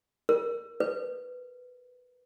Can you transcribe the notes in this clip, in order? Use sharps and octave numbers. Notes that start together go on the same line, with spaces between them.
A#4
B4